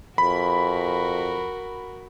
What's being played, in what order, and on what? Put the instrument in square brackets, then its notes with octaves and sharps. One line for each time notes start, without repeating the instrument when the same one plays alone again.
[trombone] F2 [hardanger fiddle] F#4 A#4 [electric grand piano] B5